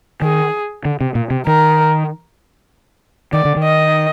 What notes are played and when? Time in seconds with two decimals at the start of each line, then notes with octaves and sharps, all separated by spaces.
0.22 D#3 G#4
0.85 D3
1.01 C3
1.15 A#2
1.30 C3
1.47 D#3 A#4
3.33 D#3 D5
3.45 D3
3.56 D#3
3.64 D#5